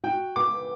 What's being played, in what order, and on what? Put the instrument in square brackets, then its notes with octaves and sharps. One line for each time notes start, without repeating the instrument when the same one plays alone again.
[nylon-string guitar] F#4 [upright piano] G5
[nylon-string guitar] B3 [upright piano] D6